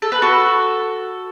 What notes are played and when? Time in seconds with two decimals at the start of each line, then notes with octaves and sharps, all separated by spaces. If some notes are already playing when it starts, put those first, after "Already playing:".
0.02 A4
0.12 B4
0.22 F#4 A4